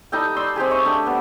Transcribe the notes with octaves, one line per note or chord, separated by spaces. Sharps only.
G3 D#4 A4 G5
D5 C6 E6
C4 D#4 G4 G#4
C#5 D#5 E5 C#6
A3 D4 G5
G3 B3